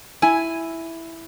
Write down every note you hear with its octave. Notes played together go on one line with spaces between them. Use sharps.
E4 G#5